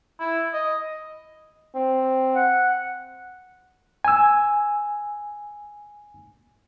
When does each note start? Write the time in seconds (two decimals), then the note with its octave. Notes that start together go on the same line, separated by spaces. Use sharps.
0.20 E4
0.53 D#5
1.75 C4
2.35 F#5
4.05 G#5 E6